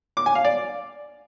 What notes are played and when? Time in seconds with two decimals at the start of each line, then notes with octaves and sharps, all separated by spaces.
0.17 D6
0.26 G#5
0.35 F5
0.45 D5